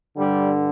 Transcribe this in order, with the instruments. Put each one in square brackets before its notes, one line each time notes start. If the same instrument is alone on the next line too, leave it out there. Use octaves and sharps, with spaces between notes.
[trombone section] G2 D3 G3